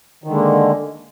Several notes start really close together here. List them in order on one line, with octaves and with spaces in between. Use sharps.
D#3 D3 G#3 A#3